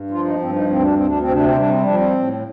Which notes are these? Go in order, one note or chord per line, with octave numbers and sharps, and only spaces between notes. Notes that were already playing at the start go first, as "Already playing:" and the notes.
Already playing: G2
F3 F4
D#4
G2 C4
D#4
D2 C4
D4
D2 C4
D4
C4
C3 D4
C4
G3 D4
C4
F3 D4
C4
A2